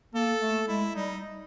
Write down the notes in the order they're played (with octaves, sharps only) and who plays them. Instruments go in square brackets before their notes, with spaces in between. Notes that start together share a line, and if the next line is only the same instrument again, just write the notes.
[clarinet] A#3 [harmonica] A4
[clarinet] A3
[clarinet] G#3 [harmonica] E4
[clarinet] G3 [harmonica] D#4